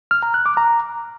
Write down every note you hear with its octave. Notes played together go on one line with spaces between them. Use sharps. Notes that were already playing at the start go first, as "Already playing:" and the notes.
F6
A#5
F#6
D6
A#5